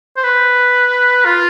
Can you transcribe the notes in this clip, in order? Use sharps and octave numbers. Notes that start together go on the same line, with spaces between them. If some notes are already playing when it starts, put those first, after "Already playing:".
C5
B4
F4